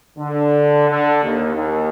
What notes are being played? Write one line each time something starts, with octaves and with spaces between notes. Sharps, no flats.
D3
D3
D#2
D#2